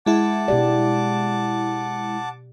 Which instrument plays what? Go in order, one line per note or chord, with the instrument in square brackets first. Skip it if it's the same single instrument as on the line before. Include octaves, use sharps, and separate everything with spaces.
[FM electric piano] G#3 E4 [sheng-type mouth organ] F#5 A5 D6
[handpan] B2 G4 D5